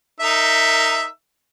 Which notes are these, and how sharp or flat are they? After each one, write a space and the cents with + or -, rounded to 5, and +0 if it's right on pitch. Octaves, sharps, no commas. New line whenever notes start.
D#4 +0 A#4 -30 E5 +0